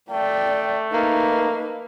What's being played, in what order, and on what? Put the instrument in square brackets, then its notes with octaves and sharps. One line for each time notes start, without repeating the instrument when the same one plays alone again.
[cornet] A3 [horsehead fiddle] D5 G5
[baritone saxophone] A#3 [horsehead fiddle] D#4 B4